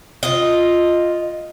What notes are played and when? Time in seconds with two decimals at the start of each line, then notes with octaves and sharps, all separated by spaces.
0.23 F4 D#5